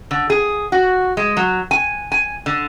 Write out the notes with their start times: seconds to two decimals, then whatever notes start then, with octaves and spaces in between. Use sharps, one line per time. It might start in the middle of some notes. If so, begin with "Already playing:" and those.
0.11 D3
0.30 G#4
0.72 F#4
1.17 G#3
1.37 F#3
1.71 G#5
2.12 G#5
2.46 D3